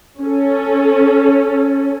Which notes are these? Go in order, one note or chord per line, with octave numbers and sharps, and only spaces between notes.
C#4 A4